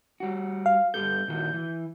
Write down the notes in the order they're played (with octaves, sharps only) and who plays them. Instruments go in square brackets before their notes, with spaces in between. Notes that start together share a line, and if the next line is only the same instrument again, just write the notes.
[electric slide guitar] G3 F#4
[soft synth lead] F5
[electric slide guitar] G2 G4 A4 [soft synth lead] G6
[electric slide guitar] A#2 D#3 F#4
E3